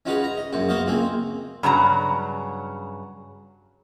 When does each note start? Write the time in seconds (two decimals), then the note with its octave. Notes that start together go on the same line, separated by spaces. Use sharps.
0.06 C#4 D#4 F4 F#4 G#4 B4
0.24 A#5
0.37 D#5
0.52 A#1 F#2 F#4
0.69 A#3 B3 F#4 C5 D#5 F5
0.86 C#2 A#3 C4 G#5
1.63 G2 C#3 F#3 A#5